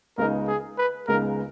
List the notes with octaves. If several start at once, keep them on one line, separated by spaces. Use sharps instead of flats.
C#2 C#3 G#3 B3 D#4 A#4
G#4
B4
C#2 C#3 G#3 B3 D#4 A#4